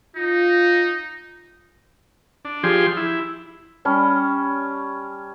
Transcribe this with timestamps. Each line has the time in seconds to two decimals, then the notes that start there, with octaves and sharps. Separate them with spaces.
0.16 D#4 F4
2.45 D4
2.63 F3 G4 G#4 C6
2.97 E4
3.85 G3 C#4 A5